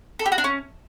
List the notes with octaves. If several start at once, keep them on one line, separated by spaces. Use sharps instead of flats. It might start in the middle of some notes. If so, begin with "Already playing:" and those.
A4
G4
F#4
D4
C#4